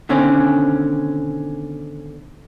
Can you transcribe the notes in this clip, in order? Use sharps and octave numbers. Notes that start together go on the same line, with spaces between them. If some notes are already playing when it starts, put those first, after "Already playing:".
B2 D3 D#3 C4 C#4